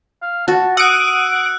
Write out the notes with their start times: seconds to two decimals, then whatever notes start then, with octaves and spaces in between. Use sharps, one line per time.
0.23 F5
0.48 F#4 A5
0.77 F#5 D#6 E6 F#6 D7